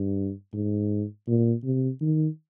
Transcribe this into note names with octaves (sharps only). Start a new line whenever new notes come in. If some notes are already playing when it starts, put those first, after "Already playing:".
Already playing: G2
G#2
A#2
C3
D#3